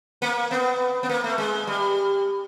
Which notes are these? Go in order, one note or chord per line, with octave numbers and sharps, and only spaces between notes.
A#3
B3
B3
A#3
A3
G#3
G3